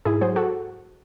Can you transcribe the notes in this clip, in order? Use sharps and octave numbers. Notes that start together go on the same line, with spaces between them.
G#2 E4 G#4
F#3 G#4 C5
F#4 A4